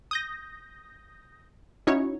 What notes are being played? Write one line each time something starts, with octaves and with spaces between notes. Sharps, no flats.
D#6 G6 A#6
C#4 D#4 E4 F#4 C#5